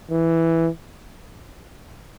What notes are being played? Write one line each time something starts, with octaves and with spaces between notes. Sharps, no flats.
E3